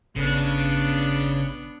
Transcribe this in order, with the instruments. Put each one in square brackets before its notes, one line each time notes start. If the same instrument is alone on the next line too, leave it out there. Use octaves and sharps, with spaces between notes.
[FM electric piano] G#1 [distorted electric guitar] C#3 [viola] B3 D4